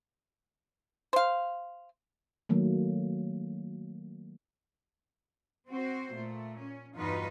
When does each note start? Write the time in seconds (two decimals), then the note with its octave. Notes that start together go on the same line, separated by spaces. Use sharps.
1.13 C5 F5
2.49 D#3 F#3 A3 A#3
5.69 C4 F#4 C5
6.14 A#2 A3
6.60 C#4
6.96 E2 G2 D#4 F4 F#4 B4